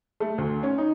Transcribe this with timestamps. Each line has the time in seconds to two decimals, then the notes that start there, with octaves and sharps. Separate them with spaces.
0.20 A3
0.38 D2
0.63 C#4
0.78 D#4